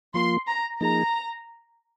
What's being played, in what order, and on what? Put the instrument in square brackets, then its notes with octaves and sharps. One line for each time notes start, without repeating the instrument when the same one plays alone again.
[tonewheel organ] F3 A#3 F4 [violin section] C6
[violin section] A#5
[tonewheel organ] F3 A#3 D#4 G#4 [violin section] A#5